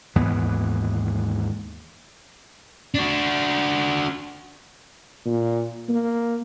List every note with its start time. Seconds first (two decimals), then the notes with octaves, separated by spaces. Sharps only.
0.15 D#2 G#2 E3 B3
2.94 D4 F#4
5.25 A#2
5.89 A#3